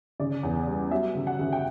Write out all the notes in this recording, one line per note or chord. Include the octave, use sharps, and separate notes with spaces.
C#3 D5
E2
G3
F#3 E5
C#3
F#5
C#3
G5